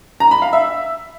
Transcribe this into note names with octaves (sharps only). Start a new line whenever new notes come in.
A#5
B5
F5
E5